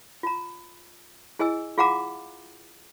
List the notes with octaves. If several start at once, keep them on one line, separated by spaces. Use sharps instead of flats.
F4 A#5
E4 G#4 D#5 G#5 E6
F4 G#4 F5 F#5 A#5 D6